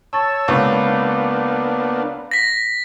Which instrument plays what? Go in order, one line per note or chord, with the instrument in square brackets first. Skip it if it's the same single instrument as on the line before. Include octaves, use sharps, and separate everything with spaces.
[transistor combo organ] C#5 E6 [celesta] A5 C#6 A6
[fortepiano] C#2 [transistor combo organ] A#3 B3 D4 [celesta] F5 B5 C#6
[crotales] A#6 B6